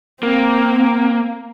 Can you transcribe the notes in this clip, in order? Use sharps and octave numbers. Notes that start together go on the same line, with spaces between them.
A#3 C4